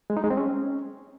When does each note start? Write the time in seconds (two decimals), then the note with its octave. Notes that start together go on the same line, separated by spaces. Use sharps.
0.10 G#3
0.17 D#4
0.24 G#3
0.30 C4
0.37 C#4